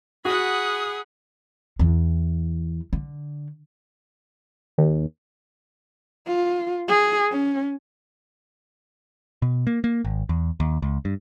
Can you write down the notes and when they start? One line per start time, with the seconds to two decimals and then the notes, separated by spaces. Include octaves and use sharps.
0.25 F#4 G#4 F#5 B5 D#6
1.79 E2 E3
2.93 D3
4.78 D#2
6.27 F4
6.88 G#4
7.31 C#4
9.42 B2
9.67 A#3
9.84 A#3
10.05 G#1
10.29 E2
10.60 D#2
10.82 C#2
11.05 G2